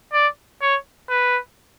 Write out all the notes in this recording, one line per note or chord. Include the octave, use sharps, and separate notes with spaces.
D5
C#5
B4